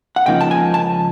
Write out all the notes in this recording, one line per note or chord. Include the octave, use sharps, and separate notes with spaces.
F#5
C#2 C#3 F3 A#3 D#4 G5
A5
G#5
A5